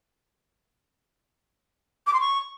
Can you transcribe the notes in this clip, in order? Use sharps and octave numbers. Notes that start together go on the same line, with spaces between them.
D6
C6
C#6